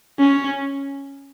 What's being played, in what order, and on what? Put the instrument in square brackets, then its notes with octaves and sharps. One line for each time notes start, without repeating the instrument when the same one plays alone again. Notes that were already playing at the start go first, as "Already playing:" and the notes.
[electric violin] C#4